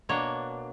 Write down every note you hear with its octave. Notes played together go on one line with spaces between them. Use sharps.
B2 A#3 D4 C#5